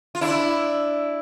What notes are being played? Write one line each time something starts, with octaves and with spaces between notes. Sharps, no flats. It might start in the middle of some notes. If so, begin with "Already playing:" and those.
F4
D4 E4